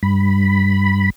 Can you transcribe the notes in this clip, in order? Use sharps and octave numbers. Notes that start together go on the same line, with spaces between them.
G2 B5